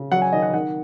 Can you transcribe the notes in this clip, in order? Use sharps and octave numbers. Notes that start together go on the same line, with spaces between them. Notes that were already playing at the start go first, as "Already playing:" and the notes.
Already playing: C#3
F#3 F#5
G#5
D#3 D#5
F#5
D#3 F#5